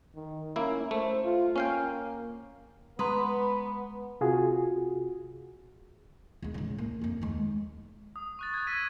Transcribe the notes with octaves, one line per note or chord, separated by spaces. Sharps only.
D#3
A#3 C#4 E4
A3 C5
F4
A#3 C#4 F5 G5
G#3 B3 B4 A#5 C6 D#6
C3 F4 F#4 G#4
E2 G#3
A1 C#3
A#3
F2 A#3
D#2 G#3
D#6
C#6 F#6 A6
F#6 G#6
D#6 E6 G#6 A#6 B6 D#7